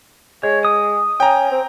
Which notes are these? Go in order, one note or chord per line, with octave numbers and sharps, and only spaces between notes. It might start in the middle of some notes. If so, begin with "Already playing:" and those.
G#3 C#5
D#6
C#4 G5 A#5
C4